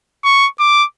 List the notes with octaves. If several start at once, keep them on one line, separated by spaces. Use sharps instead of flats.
C#6
D6